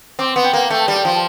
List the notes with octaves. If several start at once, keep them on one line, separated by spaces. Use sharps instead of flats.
C4 D6
B3
G5
A#3
A3 G5
G3
G5
F3